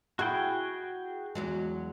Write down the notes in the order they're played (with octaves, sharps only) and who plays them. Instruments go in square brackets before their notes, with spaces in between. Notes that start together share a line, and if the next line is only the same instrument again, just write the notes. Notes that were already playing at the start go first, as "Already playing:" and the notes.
[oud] E4 [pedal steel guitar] F#4 G#4 G5
[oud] E2 F#3 G#3